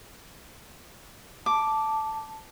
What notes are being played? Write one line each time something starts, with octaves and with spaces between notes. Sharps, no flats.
A5 D6